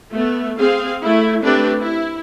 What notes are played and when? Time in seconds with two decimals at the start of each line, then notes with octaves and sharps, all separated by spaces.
0.12 A3 B3
0.58 C4 G#4 F5
1.03 A3 E4
1.43 A3 C4 D4 G4 B4
1.81 E4